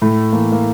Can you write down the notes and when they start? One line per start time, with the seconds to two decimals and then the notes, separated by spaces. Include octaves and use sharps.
0.02 A2 A3
0.32 E3 A#3
0.52 A#3